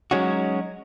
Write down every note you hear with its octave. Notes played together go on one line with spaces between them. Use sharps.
F#3 G#3 C#4 D#4 F#4